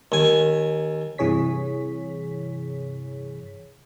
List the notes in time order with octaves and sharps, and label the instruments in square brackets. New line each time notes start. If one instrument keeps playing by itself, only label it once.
[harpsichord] D#2 G#5
[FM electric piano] G2 C3 E3 G#4 C#5 B6